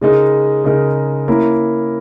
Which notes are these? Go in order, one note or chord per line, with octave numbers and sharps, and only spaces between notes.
C#3 G#3 D#4 A#4
C#3 G#3 D#4 A#4
A#3 C#4 E4 A#4